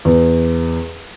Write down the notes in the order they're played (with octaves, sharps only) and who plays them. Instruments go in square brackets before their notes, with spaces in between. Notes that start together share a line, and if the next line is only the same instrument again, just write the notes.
[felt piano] E2